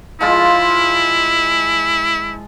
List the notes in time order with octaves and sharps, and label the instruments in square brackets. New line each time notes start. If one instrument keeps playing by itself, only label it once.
[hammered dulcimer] F3 G#3 F4 [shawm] E4